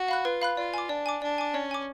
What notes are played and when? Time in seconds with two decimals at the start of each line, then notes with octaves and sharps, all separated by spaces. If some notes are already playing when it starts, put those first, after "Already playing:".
Already playing: F#4
0.08 F5 B5 F#6
0.25 F4 B4
0.42 F5 B5 F#6
0.57 F4 D5
0.74 G#5 D6
0.89 D4 D5
1.06 G#5 D6
1.22 D4 D5
1.38 G#5 D6
1.54 C#4 D5
1.71 G#5 D6